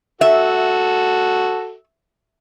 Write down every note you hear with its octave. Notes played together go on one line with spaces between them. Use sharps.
F#4 A4 E5